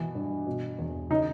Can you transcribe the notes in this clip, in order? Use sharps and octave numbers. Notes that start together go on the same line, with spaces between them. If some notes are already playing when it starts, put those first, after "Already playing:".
Already playing: B2 E3
G2
B2
E2
C#3 D#4